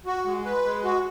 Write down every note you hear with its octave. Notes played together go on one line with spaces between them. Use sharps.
F#4
G#3
B4
G#3
F#4